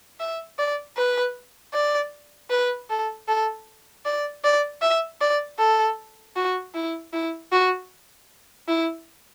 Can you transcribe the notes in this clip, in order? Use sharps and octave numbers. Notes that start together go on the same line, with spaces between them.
E5
D5
B4
D5
B4
A4
A4
D5
D5
E5
D5
A4
F#4
E4
E4
F#4
E4